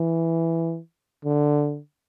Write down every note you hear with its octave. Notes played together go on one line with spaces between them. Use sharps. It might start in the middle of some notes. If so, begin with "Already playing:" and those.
Already playing: E3
D3